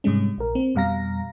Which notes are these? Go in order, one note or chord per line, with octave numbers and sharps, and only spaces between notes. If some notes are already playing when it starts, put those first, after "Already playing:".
G#2 C3 G3 G#3 C#4
A#1 A#4
C4
F2 B2 G3 F5 A#5 A#6